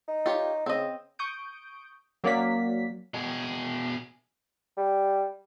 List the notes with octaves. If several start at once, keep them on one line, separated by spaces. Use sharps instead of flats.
D#4
F4 G4 C#5
C#3 C4 D#5
C#6 D#6 G6 D7
F#3 A#3 C#4 D5 F5 B6
B2 G#4
G3